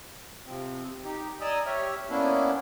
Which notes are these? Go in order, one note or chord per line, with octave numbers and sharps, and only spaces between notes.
C3 F3 C4
D#4 G4
D5 D#5 G#5 A#5 D#6 E6
G4 C#5 E5 F6
A#3 B3 C#4 D4 E4